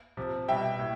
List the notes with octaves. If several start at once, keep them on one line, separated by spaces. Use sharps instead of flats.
C3 F3
B2 G3 E5 G5
A2